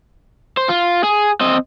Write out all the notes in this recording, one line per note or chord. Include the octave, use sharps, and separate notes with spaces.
C5
F4
G#4
C4 D#5